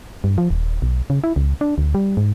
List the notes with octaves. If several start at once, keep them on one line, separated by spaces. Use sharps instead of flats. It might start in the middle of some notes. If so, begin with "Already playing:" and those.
G2
F3
D#1
B1
C#3
E4
C#2
D4
D2
G3
G#2